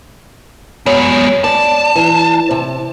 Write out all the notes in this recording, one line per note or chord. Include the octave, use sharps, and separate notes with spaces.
F#3 G#3 B3
D5 A5
E3
C3